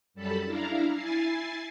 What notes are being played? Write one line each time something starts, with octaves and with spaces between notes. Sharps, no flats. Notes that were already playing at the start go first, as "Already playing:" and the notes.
F#2 G3 A4 A5 B5
D4 E4 F5 A#5
E4 G#5 A6 C7